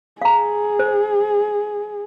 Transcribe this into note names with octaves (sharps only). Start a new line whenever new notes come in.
G#4 F5 A#5
C5